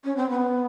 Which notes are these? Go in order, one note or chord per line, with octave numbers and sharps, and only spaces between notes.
C#4
C4
B3